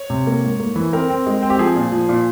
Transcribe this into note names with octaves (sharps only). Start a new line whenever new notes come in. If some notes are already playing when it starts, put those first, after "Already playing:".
Already playing: C#5
C3
A#3
G#2
A#3
E3
C4 A#4
C4
G#3
C4
G4
F3 G#4
A#2
F3
A#2